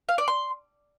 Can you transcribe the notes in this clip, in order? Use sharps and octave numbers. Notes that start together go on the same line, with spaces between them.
F5
D5
C6